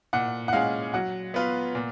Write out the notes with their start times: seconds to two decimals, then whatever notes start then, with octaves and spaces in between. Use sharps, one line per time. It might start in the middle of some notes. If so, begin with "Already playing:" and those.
0.13 A#2 F#5
0.48 F#5
0.53 G#3 C#4 G#4 F5
0.94 F#3 F#5
1.34 B3 F4 B4 F5
1.75 A#2